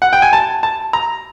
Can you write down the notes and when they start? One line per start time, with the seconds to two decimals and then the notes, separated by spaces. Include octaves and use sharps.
0.02 F#5
0.13 G5
0.22 G#5
0.33 A5
0.63 A5
0.93 A#5